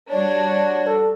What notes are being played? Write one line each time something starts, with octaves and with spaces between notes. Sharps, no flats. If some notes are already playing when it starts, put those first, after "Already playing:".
G3 D4 F#4 C#5
A4